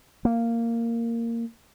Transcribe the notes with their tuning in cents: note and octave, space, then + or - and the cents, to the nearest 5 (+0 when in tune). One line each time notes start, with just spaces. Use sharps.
A#3 -10